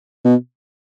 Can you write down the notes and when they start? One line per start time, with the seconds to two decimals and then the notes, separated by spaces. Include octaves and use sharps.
0.25 B2